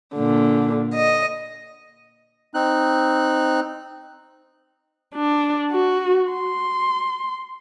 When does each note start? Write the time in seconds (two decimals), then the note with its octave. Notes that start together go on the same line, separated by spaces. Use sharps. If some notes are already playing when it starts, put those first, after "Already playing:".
0.15 A#2 D3
0.94 D#5
2.54 C4 D#4 F#6
5.15 D4
5.72 F#4
6.32 C6